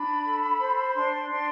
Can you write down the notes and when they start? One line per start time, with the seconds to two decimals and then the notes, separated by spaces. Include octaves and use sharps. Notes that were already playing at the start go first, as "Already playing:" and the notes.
Already playing: D4 B5
0.25 A4
0.60 C5
0.90 B5
0.95 D4 C6
1.30 D4